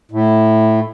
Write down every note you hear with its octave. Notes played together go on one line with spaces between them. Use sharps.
A2